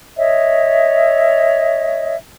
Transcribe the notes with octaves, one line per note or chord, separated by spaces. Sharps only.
C#5 D#5 E5